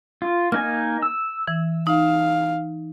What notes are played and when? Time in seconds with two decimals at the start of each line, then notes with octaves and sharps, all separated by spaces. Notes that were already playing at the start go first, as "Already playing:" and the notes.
0.22 F4
0.52 A#3 D#4 G#5 F6
1.03 E6
1.48 E3
1.87 D#4 F5